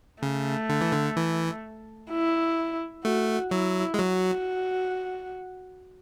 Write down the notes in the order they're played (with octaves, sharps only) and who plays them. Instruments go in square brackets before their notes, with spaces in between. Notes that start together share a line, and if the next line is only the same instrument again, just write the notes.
[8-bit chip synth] C#3 [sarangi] A3
[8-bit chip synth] D3
E3
D3
E3
[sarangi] E4
[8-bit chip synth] A3 [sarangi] F#4
[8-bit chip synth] F#3 [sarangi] E4
[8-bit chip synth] G#3
[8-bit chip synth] F#3 [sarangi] F#4